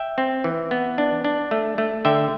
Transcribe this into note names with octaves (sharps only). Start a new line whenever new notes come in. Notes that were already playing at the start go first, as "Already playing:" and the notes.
Already playing: E5 G5
C4
E3
B3
D4
D4
A3
A3
D3 E5 G5